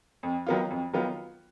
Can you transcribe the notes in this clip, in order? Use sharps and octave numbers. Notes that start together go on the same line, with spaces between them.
F2
D#3 F#3 B3 F4
F2
D#3 F#3 B3 F4